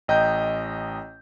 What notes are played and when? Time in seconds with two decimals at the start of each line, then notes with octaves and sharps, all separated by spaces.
0.08 A1 D#5 G5 A#5 G6